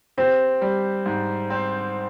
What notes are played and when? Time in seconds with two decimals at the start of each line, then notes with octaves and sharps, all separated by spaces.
0.17 C4 G4
0.61 G3
1.06 G#2
1.50 C4